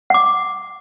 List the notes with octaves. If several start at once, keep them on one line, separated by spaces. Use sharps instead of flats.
F#5 D6